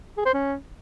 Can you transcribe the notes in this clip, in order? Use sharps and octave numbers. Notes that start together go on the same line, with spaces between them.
G#4
C5
C#4